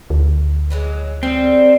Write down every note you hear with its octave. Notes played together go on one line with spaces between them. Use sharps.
D2
E3 F#3 G#3
G3 C4 D4 G#4